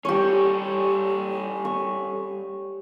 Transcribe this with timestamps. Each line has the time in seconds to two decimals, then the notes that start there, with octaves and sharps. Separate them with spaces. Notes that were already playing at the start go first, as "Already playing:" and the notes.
0.05 G3 C#4 G4 A4 C#5
1.65 C#6